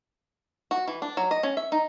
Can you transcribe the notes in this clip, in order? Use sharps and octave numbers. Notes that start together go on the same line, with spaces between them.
F#4
E3
D4
F#3
D#5
C#4
E5
D#4